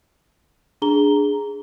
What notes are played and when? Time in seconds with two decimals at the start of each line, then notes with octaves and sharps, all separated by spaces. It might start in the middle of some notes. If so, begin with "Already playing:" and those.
0.82 D4 G#4 A#5 G7